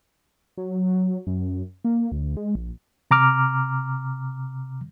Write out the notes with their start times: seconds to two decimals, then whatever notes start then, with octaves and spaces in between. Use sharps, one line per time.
0.57 F#3
1.27 F#2
1.85 A#3
2.12 D2
2.37 G#3
2.55 A#1
3.11 C3 A#5 D6 F6